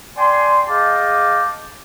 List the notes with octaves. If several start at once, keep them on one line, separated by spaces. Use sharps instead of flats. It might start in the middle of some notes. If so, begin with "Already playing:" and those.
D5 G5 G#5 C6
G#4 D#5 F5 G5 A5 D6